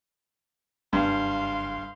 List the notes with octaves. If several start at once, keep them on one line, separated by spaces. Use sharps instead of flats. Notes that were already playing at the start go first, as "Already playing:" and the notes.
F#1 G2 F5 C6